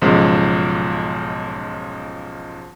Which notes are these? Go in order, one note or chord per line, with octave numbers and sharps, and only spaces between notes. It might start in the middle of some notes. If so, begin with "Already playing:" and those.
B1 G#2 C#3 F3 G#3